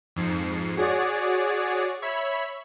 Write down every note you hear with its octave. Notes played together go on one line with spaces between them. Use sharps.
F2 G#2 C7 C#7
F#4 G#4 C#5 D5
C#5 E5 B5